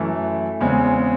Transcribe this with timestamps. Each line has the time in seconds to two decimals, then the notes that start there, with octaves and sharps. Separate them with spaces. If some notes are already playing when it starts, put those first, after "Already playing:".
Already playing: F#2 E3 A3
0.60 E2 C#3 G#3 C4